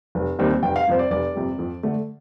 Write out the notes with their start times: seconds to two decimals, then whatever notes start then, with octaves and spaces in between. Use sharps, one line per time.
0.15 F1
0.39 D#2 D#3 G3 C4
0.63 F1 G5
0.76 F5
0.87 F2 C3 G3 C5
0.99 D5
1.11 F1 D5
1.35 F2 C3 G3
1.59 F2
1.83 D3 A3